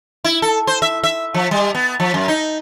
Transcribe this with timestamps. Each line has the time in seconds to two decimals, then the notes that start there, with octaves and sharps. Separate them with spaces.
0.24 E4
0.42 A4
0.67 C5
0.82 E5
1.04 E5
1.34 F3
1.51 G3
1.75 B3
2.00 F3
2.14 F#2
2.28 D#4